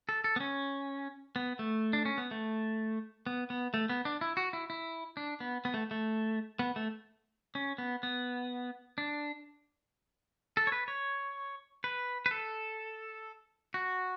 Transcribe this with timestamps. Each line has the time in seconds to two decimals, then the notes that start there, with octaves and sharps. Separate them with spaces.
0.09 A4
0.24 A4
0.36 B3
0.40 C#4
1.36 B3
1.59 A3
1.93 D4
2.05 C#4
2.18 B3
2.31 A3
3.27 B3
3.50 B3
3.74 A3
3.89 B3
4.05 D4
4.21 E4
4.37 F#4
4.53 E4
4.70 E4
5.17 D4
5.40 B3
5.65 B3
5.74 A3
5.91 A3
6.59 B3
6.76 A3
7.55 C#4
7.78 B3
8.03 B3
8.98 D4
10.57 A4
10.67 C#5
10.72 B4
10.88 C#5
11.84 B4
12.26 B4
12.31 A4
13.74 F#4